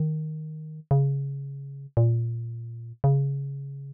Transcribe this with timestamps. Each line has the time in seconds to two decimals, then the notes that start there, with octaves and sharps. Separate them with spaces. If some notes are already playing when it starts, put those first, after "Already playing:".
Already playing: D#3
0.91 C#3
1.97 A#2
3.04 C#3